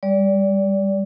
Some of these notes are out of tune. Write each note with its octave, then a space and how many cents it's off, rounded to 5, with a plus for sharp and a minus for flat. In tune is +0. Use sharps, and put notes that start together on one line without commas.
G3 +20 D5 -20